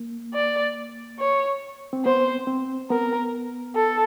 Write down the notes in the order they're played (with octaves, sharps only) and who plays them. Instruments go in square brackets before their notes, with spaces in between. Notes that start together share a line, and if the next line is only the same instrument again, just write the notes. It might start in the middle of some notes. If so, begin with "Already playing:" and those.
Already playing: [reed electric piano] A#3
[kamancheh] D5
C#5
[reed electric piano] C4
[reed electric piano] B3 [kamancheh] C5
[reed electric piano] C4
[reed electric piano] B3 [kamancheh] A#4
[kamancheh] A4